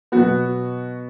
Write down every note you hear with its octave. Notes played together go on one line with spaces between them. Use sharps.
B2 F#3 B3 F#4